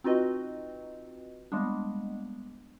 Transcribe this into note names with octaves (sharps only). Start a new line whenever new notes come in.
C4 D#4 F4 F#4 B4 D#5
G3 G#3 A#3 B3 D4